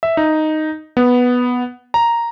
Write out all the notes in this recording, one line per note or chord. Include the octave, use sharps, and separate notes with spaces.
E5
D#4
B3
A#5